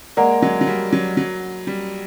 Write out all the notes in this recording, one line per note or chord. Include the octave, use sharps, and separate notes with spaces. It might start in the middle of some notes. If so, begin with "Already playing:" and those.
G#3 A#3 A#4 D5 F#5 A#5
F#3 G#3
F#3
G3
F#3
F#3
G3